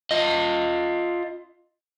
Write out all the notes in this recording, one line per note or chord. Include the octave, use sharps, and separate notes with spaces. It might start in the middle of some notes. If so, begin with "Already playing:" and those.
F4 D#5